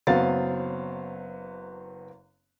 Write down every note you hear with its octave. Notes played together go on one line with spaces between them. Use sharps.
F#1 F#3 B3 C4 F5 A6